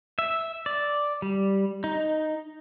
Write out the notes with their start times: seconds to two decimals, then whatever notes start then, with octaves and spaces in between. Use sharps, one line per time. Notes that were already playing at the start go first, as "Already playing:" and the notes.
0.19 E5
0.66 D5
1.22 G3
1.84 D#4